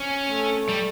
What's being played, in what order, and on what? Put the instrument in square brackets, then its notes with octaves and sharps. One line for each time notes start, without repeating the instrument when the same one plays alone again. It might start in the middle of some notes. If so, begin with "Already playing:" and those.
Already playing: [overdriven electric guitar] C#4
[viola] A3
[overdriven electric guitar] G3